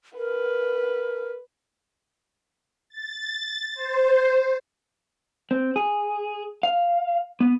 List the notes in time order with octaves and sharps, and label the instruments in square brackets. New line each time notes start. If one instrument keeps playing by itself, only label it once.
[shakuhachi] A#4 [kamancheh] B4
[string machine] A6
C5
[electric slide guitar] C4
G#4
F5
B3